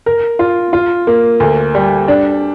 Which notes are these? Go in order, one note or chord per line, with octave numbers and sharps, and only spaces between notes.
A#4
F4
F4
A#3
D2
G3
D4